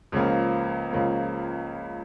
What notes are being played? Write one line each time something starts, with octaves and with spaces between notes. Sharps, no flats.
C#2 C#3 F3 A#3
C#2 C#3 F3 A#3